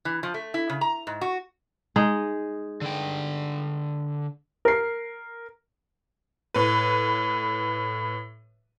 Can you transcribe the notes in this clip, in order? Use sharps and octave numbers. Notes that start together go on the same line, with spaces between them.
E3
F3
A3
E4
C#3
A#5
G#2
F#4
G#3 D#4 G#4
D3 G5
A#4 C7
A2 B4